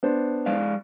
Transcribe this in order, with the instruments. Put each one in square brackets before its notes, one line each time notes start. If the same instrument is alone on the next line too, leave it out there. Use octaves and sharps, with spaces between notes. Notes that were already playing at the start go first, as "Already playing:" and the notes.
[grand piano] B3 D4 C5
[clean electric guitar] G#3 D5 F5